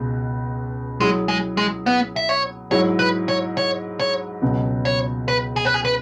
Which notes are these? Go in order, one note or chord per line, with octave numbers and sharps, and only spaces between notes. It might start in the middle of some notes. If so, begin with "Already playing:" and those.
Already playing: C#2 B2 G#3
F#3 G#3 E4 G#4
G#3
G#3
B3
E5
C#5
G#2 F#3 E4 C#5
B4
C#5
C#5
C#5
C#2 B2 F#3
C#5
B4
G#4
B4
G#4
B4